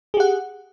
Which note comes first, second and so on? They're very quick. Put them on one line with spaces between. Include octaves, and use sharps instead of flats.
G#4 G4 F#5